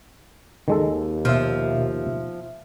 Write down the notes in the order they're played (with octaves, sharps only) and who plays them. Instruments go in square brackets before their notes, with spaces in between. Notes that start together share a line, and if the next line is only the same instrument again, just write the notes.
[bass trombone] D#2 [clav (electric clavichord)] D#3 G#3 A4
[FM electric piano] B2 E5 [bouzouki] F3